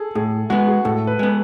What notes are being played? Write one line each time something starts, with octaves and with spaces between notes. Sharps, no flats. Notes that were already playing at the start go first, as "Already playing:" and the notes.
Already playing: G#4 A4
A2 G#4
G#3 B3 F#4
G#4
A2 A4
B4
G#3 B3